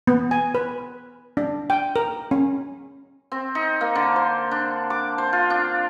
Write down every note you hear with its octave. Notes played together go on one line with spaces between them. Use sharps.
B3
G#5
B4
D4
G5
A#4
C#4
C4
D#4
A#3
D3
C5
D4
D6
C5
F4
D4